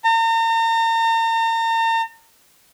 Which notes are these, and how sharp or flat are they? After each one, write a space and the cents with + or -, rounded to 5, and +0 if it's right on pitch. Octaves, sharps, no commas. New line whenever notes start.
A#5 -40